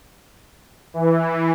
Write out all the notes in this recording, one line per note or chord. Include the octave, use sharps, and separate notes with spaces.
E3